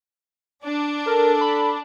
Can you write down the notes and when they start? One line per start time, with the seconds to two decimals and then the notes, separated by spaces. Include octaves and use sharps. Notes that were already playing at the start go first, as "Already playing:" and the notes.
0.65 D4
1.07 A4 A#4
1.41 B5